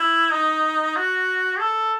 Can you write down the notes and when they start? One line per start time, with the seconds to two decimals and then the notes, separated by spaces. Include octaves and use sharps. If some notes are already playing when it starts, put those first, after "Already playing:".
Already playing: E4
0.33 D#4
0.96 F#4
1.60 A4